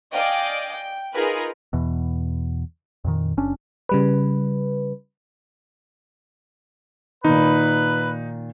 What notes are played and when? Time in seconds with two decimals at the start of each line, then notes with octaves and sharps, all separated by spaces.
0.13 D5 D#5 F5 G5 G#5
0.73 G5
1.14 D#4 F4 G#4 A#4 B4
1.73 E2 B2
3.05 F2 A#2 D#3
3.37 F#1 C#4 D4
3.89 C#3 G3 B4
7.24 A#2 D#3 D#4 B4